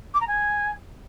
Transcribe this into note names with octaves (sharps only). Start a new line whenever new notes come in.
D6
A#5
G#5